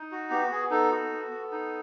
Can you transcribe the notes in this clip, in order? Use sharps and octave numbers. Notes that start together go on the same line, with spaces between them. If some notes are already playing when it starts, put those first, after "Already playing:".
Already playing: D#4
F#4
B3 G4
B3 G#4
D#4 A4
F#4
B3
B3
D#4